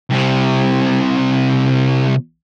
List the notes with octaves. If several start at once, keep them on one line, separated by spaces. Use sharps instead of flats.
C2 C3